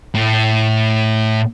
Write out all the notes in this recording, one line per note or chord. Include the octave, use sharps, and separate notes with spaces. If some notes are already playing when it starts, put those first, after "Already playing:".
A2